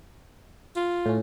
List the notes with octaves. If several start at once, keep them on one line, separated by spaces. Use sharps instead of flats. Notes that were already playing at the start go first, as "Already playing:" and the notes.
F4
A2 C#4